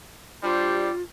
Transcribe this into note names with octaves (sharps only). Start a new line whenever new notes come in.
G3 D4 F4 G4 C5